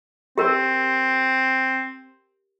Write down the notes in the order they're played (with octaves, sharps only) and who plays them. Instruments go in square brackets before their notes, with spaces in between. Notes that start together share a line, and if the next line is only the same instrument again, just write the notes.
[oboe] C4 [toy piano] G4 A#4